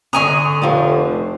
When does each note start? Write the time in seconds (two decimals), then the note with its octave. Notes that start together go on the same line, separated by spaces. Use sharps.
0.13 D3 G#5 A#5 C#6 D#6
0.62 F1 F3 C4 D4